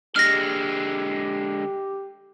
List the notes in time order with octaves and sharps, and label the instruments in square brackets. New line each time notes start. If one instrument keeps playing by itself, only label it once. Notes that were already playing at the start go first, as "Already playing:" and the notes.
[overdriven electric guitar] D3 G#3 [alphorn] G4 [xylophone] F6 A#6